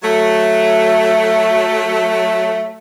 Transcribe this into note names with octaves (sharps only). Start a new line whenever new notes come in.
F#3 A3